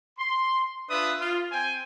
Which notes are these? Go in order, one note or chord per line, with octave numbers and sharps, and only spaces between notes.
C6
D4 F4 B4 E5 D#6
F4
C4 C5 G5 G#5